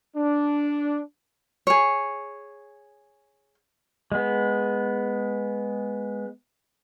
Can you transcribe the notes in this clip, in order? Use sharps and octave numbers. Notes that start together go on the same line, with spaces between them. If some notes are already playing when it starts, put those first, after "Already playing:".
D4
G#4 C#5
G#3 B3